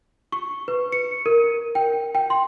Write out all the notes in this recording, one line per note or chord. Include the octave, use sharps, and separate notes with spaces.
C#6
B4
C#7
A#4
G5
G5
C6